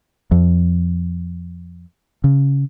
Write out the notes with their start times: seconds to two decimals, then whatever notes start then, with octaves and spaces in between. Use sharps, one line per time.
0.31 F2
2.24 C#3